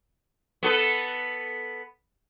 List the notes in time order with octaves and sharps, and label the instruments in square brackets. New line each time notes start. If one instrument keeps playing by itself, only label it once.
[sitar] B3 A4 B4